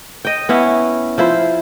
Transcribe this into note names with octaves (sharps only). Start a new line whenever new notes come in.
D#5 G5
B3 C#4 E4
F3 E4 C5